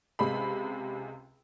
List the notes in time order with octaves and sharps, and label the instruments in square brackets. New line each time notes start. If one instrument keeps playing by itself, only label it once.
[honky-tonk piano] C#2 C3 G#3 B5